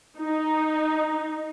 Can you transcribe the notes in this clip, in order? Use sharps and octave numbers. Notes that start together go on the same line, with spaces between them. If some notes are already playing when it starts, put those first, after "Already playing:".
D#4